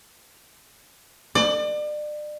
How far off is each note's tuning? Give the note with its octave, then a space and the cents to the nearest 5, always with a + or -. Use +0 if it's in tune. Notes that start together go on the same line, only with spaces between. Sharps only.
D5 +35